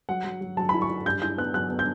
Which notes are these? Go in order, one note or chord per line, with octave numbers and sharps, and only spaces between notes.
F#3 F#5
F#3
F#3
F#3 A5
E4 B5
C#6
E4
G2 G6
E4 G6
B3 F#6
F#3 F#6
B3
G6